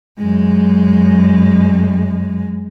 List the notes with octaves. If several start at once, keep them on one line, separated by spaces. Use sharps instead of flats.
F#2 G#3